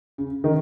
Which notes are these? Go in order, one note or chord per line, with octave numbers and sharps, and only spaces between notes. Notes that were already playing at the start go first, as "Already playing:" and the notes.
C#3
D#3